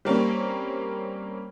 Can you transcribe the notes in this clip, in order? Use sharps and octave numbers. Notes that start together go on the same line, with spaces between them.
G3 A#3 C4 C#4